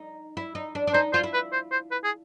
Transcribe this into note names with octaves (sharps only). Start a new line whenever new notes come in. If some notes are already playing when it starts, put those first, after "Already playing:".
Already playing: D#4
E4
D#4
D4
D4
D#4 C5
F4 C5
E4
B4
C5
C5
B4
G#4